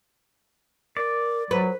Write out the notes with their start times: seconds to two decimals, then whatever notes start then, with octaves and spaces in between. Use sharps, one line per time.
0.97 A#4 D5
1.51 F#3 B4 C5